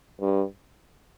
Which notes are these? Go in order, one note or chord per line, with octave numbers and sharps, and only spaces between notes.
G2